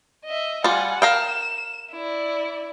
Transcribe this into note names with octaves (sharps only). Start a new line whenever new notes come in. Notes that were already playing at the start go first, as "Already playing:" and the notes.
D#5 E5
G3 F4 F#5 G#5
A#4 F5 G5 E7
E4 D5